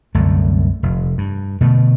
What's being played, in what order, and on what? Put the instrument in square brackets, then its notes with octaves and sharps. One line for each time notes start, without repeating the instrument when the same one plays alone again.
[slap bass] C2 F#2 D3 A3
F1
G2
B2 D3 A3